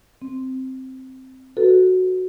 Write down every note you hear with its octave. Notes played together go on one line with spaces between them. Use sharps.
C4
F#4 A4 B4